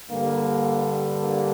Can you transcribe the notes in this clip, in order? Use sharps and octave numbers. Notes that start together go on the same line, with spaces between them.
G2 D3 G3 A#3
A#3 D4